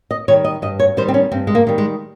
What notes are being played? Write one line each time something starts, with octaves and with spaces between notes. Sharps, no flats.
D#5
D#3 G3 C#5
D#5
G2 D#5
C#5
D#3 G3 C5
C4
C#4
G2 C4
G#3
A#3
D#3 G3
G#3